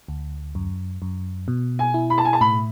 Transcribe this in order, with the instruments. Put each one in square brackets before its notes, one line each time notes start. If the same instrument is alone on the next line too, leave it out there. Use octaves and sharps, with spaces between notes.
[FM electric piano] D2
F#2
F#2
B2
[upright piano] G#5
[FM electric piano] E4
[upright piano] B5
A5
G#5
A5
[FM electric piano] A2 [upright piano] B5